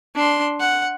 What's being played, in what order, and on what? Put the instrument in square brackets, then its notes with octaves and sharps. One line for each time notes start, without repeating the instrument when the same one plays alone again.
[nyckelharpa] D4 C6
F#5